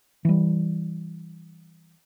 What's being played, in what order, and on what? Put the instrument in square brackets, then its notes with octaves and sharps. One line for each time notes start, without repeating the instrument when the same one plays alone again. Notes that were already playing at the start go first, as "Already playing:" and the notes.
[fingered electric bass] E3 G3